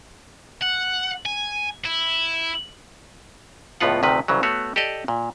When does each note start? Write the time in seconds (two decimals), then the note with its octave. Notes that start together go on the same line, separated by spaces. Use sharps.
0.62 F#5
1.26 G#5
1.86 E4
3.80 C#2 A2 F3 B3 F4 F#5
4.03 D2 C3 D#3 F3 B4
4.28 C2 C#3 E3 F#3
4.43 A3 B3 F#4 C#5
4.76 G4 A4 D5 D#5
5.08 A#2